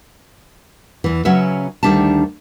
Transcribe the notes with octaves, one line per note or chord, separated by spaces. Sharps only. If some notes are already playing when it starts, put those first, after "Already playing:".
E2 E3
C#3 F#3 C#4 F#4 B4 E5
D2 D#3 G3 D4 E5 A5